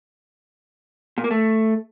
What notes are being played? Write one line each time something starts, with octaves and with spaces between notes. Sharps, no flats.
A#2
A#3
A3